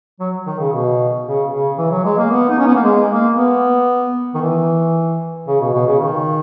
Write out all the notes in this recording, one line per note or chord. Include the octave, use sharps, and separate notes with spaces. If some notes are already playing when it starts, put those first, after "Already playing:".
F#3
D#3
C#3
B2
C#3
C#3
E3
F#3
G#3
A#3
B3
D#4
C#4
B3
A#3
G#3
A#3
B3
D#3
E3
C#3
B2
B2
C#3
D#3